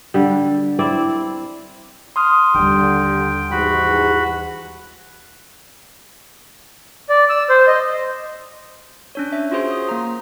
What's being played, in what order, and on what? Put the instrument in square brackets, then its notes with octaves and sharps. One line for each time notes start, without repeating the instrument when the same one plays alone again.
[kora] D3 G3
C4 E4 D5
[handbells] C6 D#6 F6
[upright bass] D#2 G3 [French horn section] D3 G4 [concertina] G5
[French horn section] G#2 E3 G4 [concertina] F#4 B5
[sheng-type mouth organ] D5
E6
C5
D#5
[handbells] C#4 D4 C#5
E5
F4 F#4 G#4 C5 C6
D#6
A#3 A#5